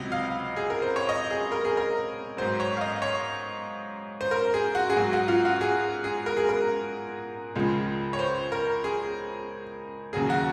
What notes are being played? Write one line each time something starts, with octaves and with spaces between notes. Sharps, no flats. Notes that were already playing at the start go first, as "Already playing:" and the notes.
Already playing: C#2 C3 F#3 D#5
F5
G#4
A#4
C5
C#5
D#5
G#4
A#4
G#4
A#4
G#2 F#3 C5
C#5
F5
D#5
C#5
C5
A#4
G#4
F#4
G#4
G#2 F#3 F#4
F#4
F4
F#4
G#4
G#4
A#4
G#4
A#4
C#2 C#3 F3 G#3
C#5
C5
A#4
G#4
D#2 C#3 F#3 G#4
F#4